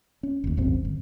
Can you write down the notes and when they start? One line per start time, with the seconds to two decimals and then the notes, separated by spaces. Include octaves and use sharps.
0.23 C#4
0.44 F#1 D#2
0.57 D#1 G#1 F#2 C4
0.85 G1